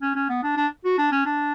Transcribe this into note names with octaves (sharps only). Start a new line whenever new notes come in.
C#4
C#4
B3
D4
D4
F#4
D4
C#4
D4